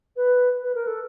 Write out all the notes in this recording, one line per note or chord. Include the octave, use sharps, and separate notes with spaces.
B4
B4
A#4
A4